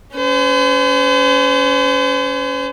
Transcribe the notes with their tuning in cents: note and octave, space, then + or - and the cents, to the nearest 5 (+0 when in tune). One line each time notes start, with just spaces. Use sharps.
C#4 +20 C5 -45